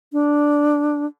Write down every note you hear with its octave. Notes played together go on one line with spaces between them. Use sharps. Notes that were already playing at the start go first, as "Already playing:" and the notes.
D4